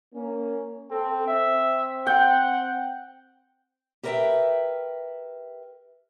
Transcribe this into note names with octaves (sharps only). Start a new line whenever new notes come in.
A#3 C#4
C4 A4
C4 E5
F#5 G5
G4 A#4 B4 D#5 E5 G5